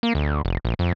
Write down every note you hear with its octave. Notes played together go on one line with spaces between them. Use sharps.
A#3
D2
F1
A#1
F2